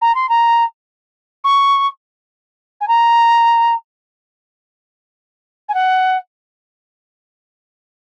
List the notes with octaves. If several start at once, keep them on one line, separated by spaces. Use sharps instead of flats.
A#5
C6
A#5
C#6
G#5
A#5
G#5
F#5